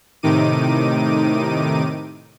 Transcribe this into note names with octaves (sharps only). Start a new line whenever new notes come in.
A2 C3 D#3 D#4 D6 D#7